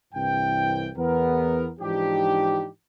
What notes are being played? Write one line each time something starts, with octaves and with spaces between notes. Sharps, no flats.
C2 G2 E3 G5
E2 B3 A#4
G#2 E3 F3 D4 D#4 G4